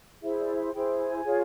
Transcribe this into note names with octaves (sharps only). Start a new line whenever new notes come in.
E4 G#4 C5 E5
D5
E5
E4 G#4 C5 G5
G#5
F4 G#4 C#5